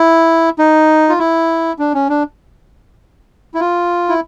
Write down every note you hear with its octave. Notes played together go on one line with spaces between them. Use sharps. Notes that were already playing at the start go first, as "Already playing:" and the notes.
Already playing: E4
D#4
F4
E4
D4
C#4
D4
E4
F4
E4